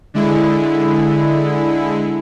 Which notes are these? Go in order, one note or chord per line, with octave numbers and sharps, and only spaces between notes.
D3 G#3 E4